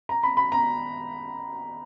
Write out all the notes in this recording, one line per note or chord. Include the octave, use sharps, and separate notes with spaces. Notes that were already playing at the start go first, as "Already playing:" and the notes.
A#5
B5
B5
A#5